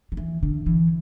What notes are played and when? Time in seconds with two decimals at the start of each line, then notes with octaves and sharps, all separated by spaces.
0.12 F#3
0.17 E3
0.43 D3
0.66 E3